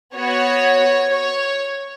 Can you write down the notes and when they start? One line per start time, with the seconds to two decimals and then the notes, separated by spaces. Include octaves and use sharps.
0.15 B3 F#4 C#5
1.11 C#5